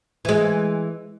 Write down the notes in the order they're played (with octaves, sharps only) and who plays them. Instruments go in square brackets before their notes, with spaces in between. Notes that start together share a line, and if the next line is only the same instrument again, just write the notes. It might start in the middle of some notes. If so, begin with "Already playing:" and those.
[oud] E3 G#3